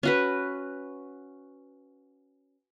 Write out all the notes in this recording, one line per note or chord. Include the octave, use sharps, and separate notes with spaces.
C#4 F#4 B4